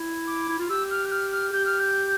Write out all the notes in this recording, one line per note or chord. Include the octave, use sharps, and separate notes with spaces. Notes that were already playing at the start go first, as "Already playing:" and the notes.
Already playing: E4
D6
E4
F4
G4 E6
F6
G6
F6
F6
G4 G6
F6
G6